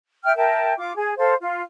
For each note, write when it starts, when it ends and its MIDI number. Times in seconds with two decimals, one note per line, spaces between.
0.25 0.36 76
0.25 0.36 79
0.25 0.36 89
0.36 0.73 70
0.36 0.73 76
0.36 0.73 79
0.36 0.73 81
0.77 0.92 65
0.77 0.92 86
0.95 1.12 68
1.18 1.33 69
1.18 1.33 72
1.18 1.33 77
1.41 1.61 65